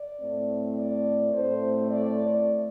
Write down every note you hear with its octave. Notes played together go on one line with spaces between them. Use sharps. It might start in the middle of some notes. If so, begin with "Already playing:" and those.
Already playing: D5
A2 A3 C4
D5
A2 A3 C4 C5
D5